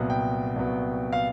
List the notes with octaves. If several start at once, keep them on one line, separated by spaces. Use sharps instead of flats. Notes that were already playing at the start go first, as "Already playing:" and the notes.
Already playing: C2 A#2 F#3 B3
G5
C2 A#2 F#3 B3
F5